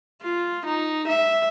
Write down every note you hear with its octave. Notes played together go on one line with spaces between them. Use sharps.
F4
D#4
E5